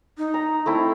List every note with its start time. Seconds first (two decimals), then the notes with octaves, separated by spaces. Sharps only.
0.18 D#4
0.34 A#5
0.66 A3 C4 E4